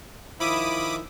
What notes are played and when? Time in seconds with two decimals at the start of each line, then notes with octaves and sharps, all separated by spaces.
0.40 D#3 F3 E4 B5 D6 D#6